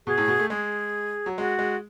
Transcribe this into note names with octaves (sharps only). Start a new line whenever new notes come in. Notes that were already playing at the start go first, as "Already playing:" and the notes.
B2 G#4
A2
B2
A3
G#3 G#4
F#3
G#3 F#4
G#3